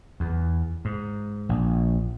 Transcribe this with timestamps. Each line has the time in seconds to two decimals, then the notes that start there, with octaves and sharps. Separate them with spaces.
0.20 E2
0.85 G#2
1.49 A#1